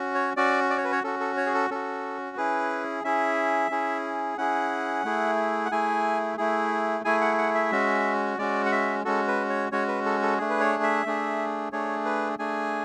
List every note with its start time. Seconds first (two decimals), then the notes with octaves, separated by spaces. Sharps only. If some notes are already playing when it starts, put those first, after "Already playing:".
Already playing: C#4 F#4
0.15 C#5
0.37 C#4 F#4 D5
0.70 D5
0.77 C#5
0.85 B4
0.92 C#5
1.04 C#4 F#4 A4
1.20 A4
1.37 C#5
1.46 G#4
1.54 A4
1.71 C#4 F#4 A4
2.37 C#4 E4 G#4 B4
3.04 C#4 E4 G#4 E5
3.71 C#4 E4 G#4
4.37 C#4 E4 G#4 F#5
5.05 A3 E4 G#4
5.66 F#5
5.71 A3 E4 G#4 G#5
6.37 A3 E4 G#4
7.05 A3 E4 G#4 G#5
7.21 F#5
7.38 F#5
7.55 E5
7.72 G#3 C#4 F#4
8.38 G#3 C#4 F#4 D5
8.66 F#5
8.72 E5
9.05 G#3 C#4 F#4 A4
9.28 B4
9.50 C#5
9.72 G#3 C#4 F#4 C#5
9.88 B4
10.05 A4
10.22 A4
10.38 A3 D4 G#4
10.50 B4
10.60 C#5
10.83 E5
11.06 A3 D4 G#4
11.72 A3 D4 G#4 C#5
12.05 B4
12.39 A3 D4 G#4 G#5